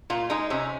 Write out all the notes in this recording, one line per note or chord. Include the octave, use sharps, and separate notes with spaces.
A#2 F4
G#3 D#4
C3 C#4